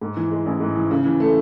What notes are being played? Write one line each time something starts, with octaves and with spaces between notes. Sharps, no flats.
G#2
E3
G#3
A1
G#2
E3
C#3
E3
A3